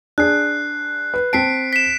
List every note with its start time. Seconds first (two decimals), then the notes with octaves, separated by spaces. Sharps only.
0.18 D4 G#4 F#6 C7
1.14 B4
1.33 C4 A5 B6 C7 D7
1.73 B6 E7